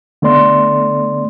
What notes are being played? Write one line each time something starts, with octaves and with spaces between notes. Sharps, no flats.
D3 A3 B3 D5 C6